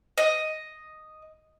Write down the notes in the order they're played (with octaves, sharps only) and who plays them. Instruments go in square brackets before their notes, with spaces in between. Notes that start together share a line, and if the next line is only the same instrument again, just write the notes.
[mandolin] D#5